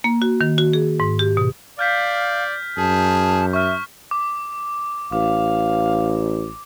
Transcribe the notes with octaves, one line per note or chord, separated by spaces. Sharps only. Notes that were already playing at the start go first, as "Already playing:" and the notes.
A#3
F#4
D#3
F#4
G#4
G#2
G4
B2
D5 F5 F6 G6 B6
F#2 G#4 A5
E5 C#6 F6
D6
A1 F5 D6